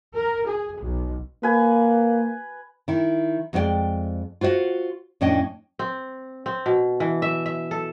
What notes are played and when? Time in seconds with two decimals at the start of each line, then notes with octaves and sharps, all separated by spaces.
0.14 A#4
0.46 G#4
0.80 B1
1.43 A#3 B4 G#5
2.88 D#3 E4
3.53 F2 G#3 B3 F#4 D5 G5
4.41 F4 F#4 C5 D#5 F#5
5.21 F2 A2 C#4 D4 D#5 G5
5.79 C4
6.46 C4
6.66 B2
7.00 E3
7.22 E5
7.46 E5
7.71 A4